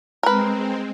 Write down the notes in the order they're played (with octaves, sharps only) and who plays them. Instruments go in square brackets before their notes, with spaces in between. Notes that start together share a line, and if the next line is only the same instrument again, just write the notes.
[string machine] G#3 C4 [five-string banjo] A#4 B4